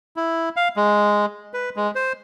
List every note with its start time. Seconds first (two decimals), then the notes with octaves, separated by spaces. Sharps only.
0.16 E4
0.56 F5
0.76 G#3
1.54 B4
1.76 G#3
1.95 C5